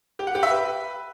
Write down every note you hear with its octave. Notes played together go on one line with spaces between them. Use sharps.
G4
F#5
G4
E5
B4